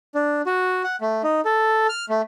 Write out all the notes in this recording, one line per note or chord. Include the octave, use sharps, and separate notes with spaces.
D4
F#4
F#5
A3
D#4
A4
F6
A3